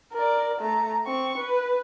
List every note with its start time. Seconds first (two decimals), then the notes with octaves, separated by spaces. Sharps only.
0.13 A#4 D5
0.60 A3 A#5
1.06 C4 C#6
1.38 B4